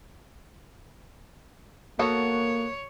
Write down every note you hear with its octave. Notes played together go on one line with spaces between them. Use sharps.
A#3 B3 F#4 A4 C#5